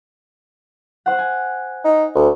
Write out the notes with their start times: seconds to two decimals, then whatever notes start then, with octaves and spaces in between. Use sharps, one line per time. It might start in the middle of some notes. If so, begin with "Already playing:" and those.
1.06 C5 F#5
1.18 G#5
1.85 D#4
2.15 D2